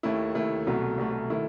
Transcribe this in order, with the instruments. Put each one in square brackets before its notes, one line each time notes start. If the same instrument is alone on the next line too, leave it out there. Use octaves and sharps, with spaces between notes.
[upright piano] D#2 D#3 A3 E4
D#2 D#3 A3 E4
C2 B2 F#3 A3
C2 B2 F#3 A3
D#3 A3 E4